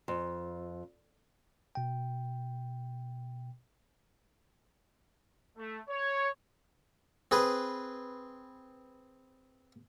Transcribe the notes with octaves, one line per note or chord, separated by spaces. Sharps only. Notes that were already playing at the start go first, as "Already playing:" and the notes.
F2
B2 G5
A3
C#5
C4 G#4 B4